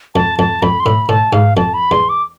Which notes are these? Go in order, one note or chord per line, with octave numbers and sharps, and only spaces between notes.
F2 A5
F2 A5
F2 B5
C6
A2 B5
A2 A5
G#2 F5
F2 A5
B5
E2 C6
D6